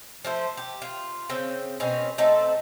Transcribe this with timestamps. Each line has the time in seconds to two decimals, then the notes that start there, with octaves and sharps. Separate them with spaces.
0.24 F3 A3 C5
0.57 G4
0.82 F4
1.29 C#3 C4 G5
1.80 B2 C4 C#4
2.18 A3 C4 D#4 A4